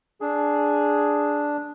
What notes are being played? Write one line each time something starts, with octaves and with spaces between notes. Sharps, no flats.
D4 G#4